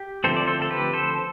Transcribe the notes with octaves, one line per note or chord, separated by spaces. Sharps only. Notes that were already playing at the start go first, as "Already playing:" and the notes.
Already playing: G4
D3 F3 A3 C4 A4 C5
D5
A4 C5
A4
G4 B4
A4 C5